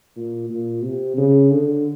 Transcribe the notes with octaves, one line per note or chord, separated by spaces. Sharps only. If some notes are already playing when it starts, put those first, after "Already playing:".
A#2
A#2
C3
C#3
D3